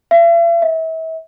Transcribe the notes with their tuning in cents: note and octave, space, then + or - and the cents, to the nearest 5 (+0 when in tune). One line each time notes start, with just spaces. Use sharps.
E5 +45
E5 -35